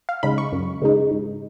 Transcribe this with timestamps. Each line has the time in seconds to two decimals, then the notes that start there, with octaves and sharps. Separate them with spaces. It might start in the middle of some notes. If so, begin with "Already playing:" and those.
0.09 F5
0.23 C#3 G#3 D#4 B5
0.38 C#6
0.52 F#2
0.82 C#3 G#3 D#4
1.11 G#2